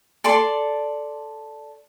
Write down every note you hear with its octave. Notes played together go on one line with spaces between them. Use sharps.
A4 D5 A5 C6